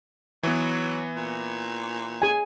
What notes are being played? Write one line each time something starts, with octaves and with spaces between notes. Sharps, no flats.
E3 F#3 B3
A#2
G#4 G#5